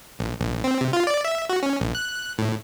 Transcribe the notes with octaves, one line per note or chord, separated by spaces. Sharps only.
A#1
A#1
C4
C3
F4
D5
E5
F#4
C#4
A#1
F#6
A2